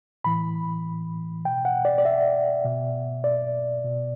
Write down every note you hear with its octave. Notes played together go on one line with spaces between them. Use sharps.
A2 E3 B5
B2 G5
F#5
D5
D5
E5
B2
D5
B2